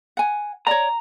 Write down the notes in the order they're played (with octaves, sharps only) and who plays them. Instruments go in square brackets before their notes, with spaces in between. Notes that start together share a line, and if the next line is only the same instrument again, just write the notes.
[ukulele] F#5 G#5
[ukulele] C#5 D5 [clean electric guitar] A#5